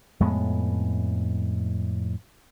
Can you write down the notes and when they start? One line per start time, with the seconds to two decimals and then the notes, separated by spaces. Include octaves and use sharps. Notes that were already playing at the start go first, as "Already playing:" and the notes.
0.20 F2 A2 G#3 B3